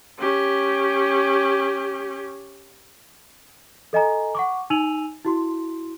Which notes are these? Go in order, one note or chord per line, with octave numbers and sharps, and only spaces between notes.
C#4 G4
A4 D#5 G#5 A#5
F#5 C#6 D6
D#4 G#5 E6 D#7 F7 F#7
E4 F#4 C6